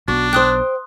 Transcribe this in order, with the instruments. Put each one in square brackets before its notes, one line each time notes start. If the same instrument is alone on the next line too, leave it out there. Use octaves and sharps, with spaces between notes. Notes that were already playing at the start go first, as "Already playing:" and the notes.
[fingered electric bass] B1 B3 [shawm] D4 [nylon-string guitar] F#4
[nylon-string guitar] C5 G5 [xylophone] C6 D#6 F#6